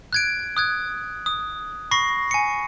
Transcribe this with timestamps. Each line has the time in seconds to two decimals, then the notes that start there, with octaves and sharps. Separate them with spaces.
0.13 F#6 G#6 D7
0.57 D#6 F#6 G#6
1.26 D#6
1.91 B5 C#6 A#6 C7
2.31 G#5 C#7